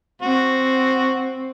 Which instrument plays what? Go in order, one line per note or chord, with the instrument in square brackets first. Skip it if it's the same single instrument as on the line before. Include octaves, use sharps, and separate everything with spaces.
[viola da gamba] C4 [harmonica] F#4